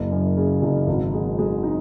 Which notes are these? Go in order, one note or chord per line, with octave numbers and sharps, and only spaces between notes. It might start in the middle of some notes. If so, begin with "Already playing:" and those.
Already playing: F#1 A#3
F#2
C#3
F#1
G#1
G#3
G#3
D#4